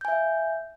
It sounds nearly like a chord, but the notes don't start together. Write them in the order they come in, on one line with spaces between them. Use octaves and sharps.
G6 G#5 E5 F5